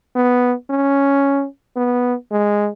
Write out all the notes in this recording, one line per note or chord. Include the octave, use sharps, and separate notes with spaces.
B3
C#4
B3
G#3